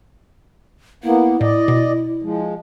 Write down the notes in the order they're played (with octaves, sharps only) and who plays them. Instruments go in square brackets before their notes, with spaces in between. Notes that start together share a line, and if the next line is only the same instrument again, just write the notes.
[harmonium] A#3 B3 [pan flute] E4
[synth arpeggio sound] A2 [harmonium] D5 D#5
[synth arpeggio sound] B2
[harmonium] F3 G#3